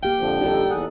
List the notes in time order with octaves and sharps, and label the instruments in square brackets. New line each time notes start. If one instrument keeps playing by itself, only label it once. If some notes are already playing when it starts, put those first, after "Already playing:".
[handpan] A#3 G4 F5 [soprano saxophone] G5
[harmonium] F2 D3 F3
[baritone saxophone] G3 [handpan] D#4 A4
[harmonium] E2 G#4 F#5